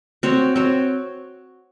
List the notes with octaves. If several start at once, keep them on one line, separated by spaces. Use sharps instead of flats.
C4 F#4 C#5
C4 F#4 C#5